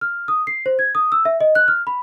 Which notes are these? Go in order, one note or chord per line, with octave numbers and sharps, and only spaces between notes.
F6
D#6
C7
C5
G#6
D#6
E6
E5
D#5
F#6
F6
B5